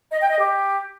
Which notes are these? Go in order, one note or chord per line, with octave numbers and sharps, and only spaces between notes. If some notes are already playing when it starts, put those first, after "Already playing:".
D#5
G5
D#5
G4